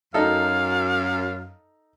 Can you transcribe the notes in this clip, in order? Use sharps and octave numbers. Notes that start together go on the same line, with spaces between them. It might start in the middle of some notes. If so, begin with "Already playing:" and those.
F#2 D#4 A4 F5